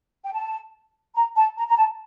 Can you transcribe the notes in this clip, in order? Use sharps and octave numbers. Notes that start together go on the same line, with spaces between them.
G5
A5
A#5
A5
A#5
A#5
A5